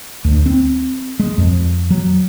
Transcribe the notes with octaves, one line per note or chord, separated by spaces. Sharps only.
D2
C4
G#3
F2
F#3